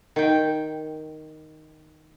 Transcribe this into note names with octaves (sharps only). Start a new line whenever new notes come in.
D#3 G5